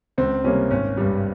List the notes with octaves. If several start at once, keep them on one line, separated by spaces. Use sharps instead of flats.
C#2 C4
C3 G3 A#3 C#4
G#1 C#4
G2 G3